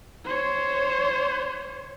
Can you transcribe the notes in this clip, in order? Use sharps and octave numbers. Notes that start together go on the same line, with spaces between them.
C5 C#5